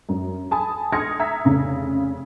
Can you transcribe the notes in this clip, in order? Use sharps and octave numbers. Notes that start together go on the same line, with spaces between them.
F#2
G#5 A5 B5 D#6
C6 D#6 F6 G#6 A#6 C#7
E5 A#5 D#6 E6 G#6 B6
F1 C#3